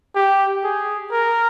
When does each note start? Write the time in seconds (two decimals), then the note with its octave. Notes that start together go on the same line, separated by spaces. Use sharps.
0.15 G4
0.64 G#4
1.12 A#4